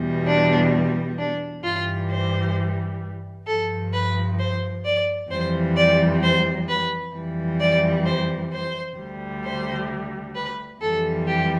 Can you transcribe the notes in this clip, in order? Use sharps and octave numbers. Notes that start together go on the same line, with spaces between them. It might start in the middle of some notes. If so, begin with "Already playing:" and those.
Already playing: E2 B2 G3
D4
D4
G2 E3 G3 F4
C5
G2 F3 A4
B4
C5
D5
F2 E3 G3 C5
D5
C5
B4
F2 E3 G3
D5
C5
C5
D2 D3 G3
C5
B4
F2 E3 G3 A4
G4